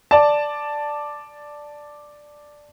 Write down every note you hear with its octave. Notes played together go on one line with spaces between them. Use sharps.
D5 A5